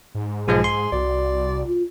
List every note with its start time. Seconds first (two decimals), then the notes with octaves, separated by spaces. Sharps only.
0.15 G#2
0.48 B1 F3 G#3 G#4
0.64 C6
0.92 C2 F#4 D5
1.66 F4